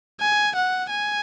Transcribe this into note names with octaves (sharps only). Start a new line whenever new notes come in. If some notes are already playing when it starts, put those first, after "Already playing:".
G#5
F#5
G#5